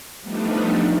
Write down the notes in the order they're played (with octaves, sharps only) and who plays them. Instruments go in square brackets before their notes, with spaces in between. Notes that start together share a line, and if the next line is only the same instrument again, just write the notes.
[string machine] F3 G3 A3 B3 D4 D#4